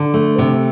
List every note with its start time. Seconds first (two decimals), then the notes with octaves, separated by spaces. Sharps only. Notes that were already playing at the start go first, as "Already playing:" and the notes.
Already playing: D3
0.14 A3
0.38 C3